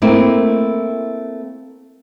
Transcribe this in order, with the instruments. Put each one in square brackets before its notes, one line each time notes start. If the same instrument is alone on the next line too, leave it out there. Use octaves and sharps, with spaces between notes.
[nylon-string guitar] A3 A#3 C4 E4